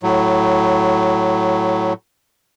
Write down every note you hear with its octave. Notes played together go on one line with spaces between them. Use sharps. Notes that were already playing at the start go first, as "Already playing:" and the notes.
A2 F#3